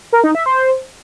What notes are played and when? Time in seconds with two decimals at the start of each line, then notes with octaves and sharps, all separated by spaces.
0.13 A#4
0.24 D#4
0.35 E5
0.46 C5